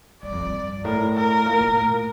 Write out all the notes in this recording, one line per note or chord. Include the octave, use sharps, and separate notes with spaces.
G2 D5
F2
G2
A2 A#4
A#4
A#2
A#2
A2